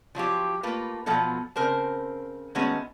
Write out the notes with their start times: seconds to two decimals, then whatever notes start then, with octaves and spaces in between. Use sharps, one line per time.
0.15 F3 F#3 F4 G4
0.63 A3 A#3 F4 B4
1.06 B2 F3 F#3 B3 F4 A4
1.56 C#3 C4 A#4 C5 A5
2.55 D#3 G#3 A3 B3 C#4 F#4